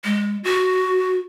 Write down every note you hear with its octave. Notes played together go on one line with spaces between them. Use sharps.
G#3
F#4